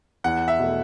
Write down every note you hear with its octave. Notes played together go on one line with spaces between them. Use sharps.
E2 F#5
E5
B2 A3